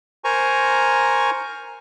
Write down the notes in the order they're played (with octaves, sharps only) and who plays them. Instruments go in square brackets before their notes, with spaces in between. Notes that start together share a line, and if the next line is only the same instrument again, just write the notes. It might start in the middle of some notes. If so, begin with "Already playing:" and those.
[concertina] A#4 C5 G#5 A#5 C#6